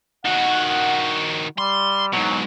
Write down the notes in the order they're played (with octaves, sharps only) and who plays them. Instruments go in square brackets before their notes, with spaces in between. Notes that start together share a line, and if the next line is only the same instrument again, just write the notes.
[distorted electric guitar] D#3 F#4 [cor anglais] F#5
[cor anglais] G3 [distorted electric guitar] C6
[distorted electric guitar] G#2 B2 [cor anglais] F#3